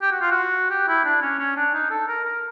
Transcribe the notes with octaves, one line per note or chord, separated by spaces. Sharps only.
G4
F#4
F4
F#4
G4
E4
D4
C#4
C#4
D4
D#4
A4
A#4
A#4